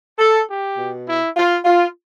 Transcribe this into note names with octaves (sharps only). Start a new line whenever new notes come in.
A4
G4
B2
E4
F4
F4